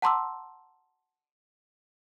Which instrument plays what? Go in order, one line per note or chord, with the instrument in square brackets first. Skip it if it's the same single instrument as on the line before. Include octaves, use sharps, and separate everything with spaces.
[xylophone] F#5 A5 A#5 C6 D6 E6